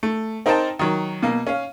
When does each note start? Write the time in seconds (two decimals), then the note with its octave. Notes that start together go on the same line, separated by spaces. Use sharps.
0.03 A3
0.46 C4 D#4 A#4 C5 G5 A5
0.79 D#3 F#3
1.23 B2 A#3
1.47 C#4 F5